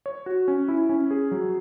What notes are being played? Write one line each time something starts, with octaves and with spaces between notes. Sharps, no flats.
C#5
F#4
C#4
E4
C#4
G#4
F#3